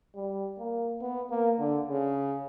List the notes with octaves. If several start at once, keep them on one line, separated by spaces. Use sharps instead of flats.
G3
A#3
B3
A#3
D3
C#3